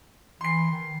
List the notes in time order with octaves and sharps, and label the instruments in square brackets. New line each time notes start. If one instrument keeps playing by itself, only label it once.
[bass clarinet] E3 [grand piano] C6 C7
[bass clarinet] D#3